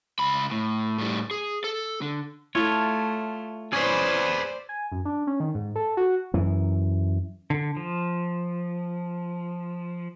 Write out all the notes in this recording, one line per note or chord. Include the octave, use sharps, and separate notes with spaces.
C#2 B5
A2
A2 G3
G#4
A4
D3
A3 E4 F4 A4 C#5
C#4 G#4 B4 C5 D5
G#5
F#2
D4
C#4
D#3
G#2
A4
F#4
F#2 E3
D3
F3